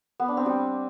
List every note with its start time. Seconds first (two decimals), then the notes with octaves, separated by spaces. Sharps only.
0.20 B3
0.28 D4
0.37 C4
0.46 G3